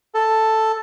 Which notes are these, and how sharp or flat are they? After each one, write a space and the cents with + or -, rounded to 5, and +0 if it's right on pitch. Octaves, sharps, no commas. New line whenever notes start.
A4 +5